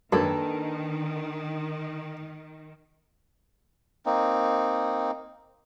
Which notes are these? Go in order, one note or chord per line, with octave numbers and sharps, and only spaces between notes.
F#2 D#3 A#3 D4 A4 B4
A#3 C4 D#4